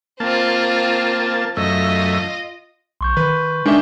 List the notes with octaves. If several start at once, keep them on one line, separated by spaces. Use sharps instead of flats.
A#3 C4 F4 A5
F#2 A3 F4 D#5 E5
B1 C6 C#6 G6
D#3 B4
D#3 G#3 C#4 D4 E5 G7